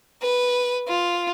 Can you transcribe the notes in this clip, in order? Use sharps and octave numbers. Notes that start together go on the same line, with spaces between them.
B4
F4